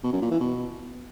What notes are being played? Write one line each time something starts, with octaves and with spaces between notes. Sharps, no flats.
B2
F#2
A#2
E3
B2